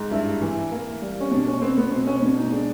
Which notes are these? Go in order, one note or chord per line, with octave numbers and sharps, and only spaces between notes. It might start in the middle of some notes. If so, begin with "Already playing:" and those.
Already playing: G#2
G2 E4
E3
A#3
G3
C#4
B2 D4
C#4
B3 C4
B3
B2 C4
C#4
B2 D4
D#4
G#3 D4